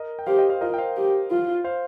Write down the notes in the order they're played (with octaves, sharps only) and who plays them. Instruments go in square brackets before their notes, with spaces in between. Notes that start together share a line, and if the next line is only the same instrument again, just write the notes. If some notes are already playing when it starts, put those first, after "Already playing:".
Already playing: [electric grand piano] A#4 D#5
G5
[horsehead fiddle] G4 [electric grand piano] C5 F5
[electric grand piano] D#5 G5
C5 F5
[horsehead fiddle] F4 [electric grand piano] A#4 D#5
[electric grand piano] G5
C5 F5
[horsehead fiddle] G4
F4
[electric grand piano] C5 F5